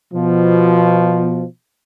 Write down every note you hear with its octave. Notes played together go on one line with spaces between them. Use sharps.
B2 F3